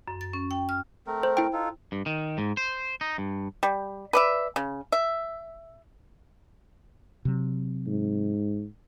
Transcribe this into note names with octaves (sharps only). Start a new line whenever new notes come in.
F#2
A6
C#4
G5
F6
A3 C4 A#4
C5
E4 G5
D#4 F4 A4
G2
D#3
G#2
C5
D#4
G2
G3
B4 D5 E5
C#3
E5
C3 F#3
G#2